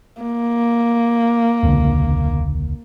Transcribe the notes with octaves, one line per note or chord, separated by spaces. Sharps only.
A#3
E1 C#2 D3